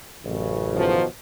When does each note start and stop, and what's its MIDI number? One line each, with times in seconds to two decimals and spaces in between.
0.25 1.01 33
0.25 1.01 42
0.25 1.01 49
0.76 1.04 47
0.76 1.04 51
0.76 1.04 53